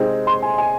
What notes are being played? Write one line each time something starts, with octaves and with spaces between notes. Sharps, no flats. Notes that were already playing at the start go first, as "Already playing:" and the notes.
Already playing: C3 G#3 C4 D#4
C6
G#5
G#5